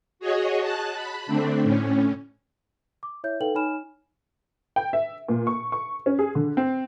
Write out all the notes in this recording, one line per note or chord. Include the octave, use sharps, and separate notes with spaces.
F#4 G#4 C#5 D#5
A5 F#6
B5
D3 A3 C4 D4
A2 C#4
D6
E4 C#5 E5 G6
D#4 A4 B4 F5 G5 F#7
D#4 C#5 G#5 B5 F6 E7
G5
E5
A#2
C#6
C#6
C#4
G#4
D3
C4